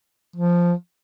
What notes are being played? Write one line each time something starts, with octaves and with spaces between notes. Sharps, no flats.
F3